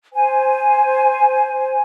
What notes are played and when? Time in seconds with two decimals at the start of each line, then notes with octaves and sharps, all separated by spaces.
0.13 C5 G#5